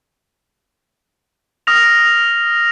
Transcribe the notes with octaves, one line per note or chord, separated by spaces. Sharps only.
D#6 F6 A#6 F7